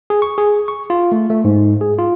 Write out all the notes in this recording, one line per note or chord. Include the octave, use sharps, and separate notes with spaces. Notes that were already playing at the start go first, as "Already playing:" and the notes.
G#4
C#6
G#4
C#6
F4
A3
A3
G#2
G#4
F4